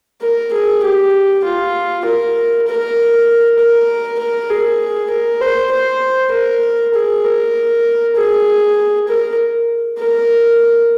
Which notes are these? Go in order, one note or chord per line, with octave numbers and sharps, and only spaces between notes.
A#4
G#4
G4
F4
A#4
A#4
A#4
A#4
G#4
A#4
C5
C5
A#4
G#4
A#4
G#4
A#4
A#4